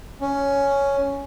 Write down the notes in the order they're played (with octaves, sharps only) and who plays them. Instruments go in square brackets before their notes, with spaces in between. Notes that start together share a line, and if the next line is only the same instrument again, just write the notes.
[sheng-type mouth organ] C#4